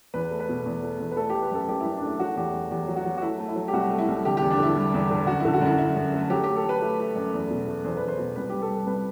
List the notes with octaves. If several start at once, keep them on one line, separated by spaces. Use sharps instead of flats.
E2 B4
A3
B4
B2
E2
A3
E2
B4
A3 A4
A3 G4
B4
F#2 A4
F#2 G4
E4
F#2
D4
A3 E4
F#3 F#4
E2 G4
E2
E2 G4
F#3
F#4
F#3
F#4
A3 E4
A3
E4
F#3
G4
C2 F#4
A3
E4
C2
D3 G4
G4
E2
D4
D3 E4
G3
E2
D3
F#2 F#4
E4
D3
F#4
F#2 E4
F#2 E4
F#2
A3
F#3 G4
A3 G4
A4
A3 B4
A3
A3
F#2
E2
B2
A3
E2 C5
E2 B4
C5
B2
C2 B4
C2 G4
A4
G3
C2 B4